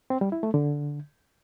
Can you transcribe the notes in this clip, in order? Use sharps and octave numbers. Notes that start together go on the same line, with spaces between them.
C4
G3
E4
A3
D3